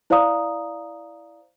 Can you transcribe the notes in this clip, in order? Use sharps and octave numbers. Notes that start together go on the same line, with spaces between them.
E4 C5 D5 F5 A#5 D#6